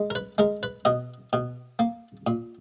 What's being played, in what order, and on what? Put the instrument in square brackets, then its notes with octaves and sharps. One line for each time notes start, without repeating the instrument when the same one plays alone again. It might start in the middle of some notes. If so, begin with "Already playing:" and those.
Already playing: [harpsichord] G#3
A#4
B4
G#3 A#4
B4
B2 D#5
B2
A#3
A#2